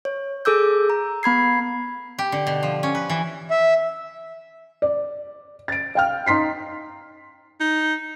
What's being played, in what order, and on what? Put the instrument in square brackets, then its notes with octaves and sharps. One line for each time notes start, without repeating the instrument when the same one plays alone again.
[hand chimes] C#5
G#4 A4 D6 E6 G6
A#5
B3 B5 G#6 C7
[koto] G4
D3
B2
F3
C#4
B4
E3
[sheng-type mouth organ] E5
[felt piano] D5
A6 D7
F5 G5 F6
D#4 C6 B6 C7
[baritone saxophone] D#4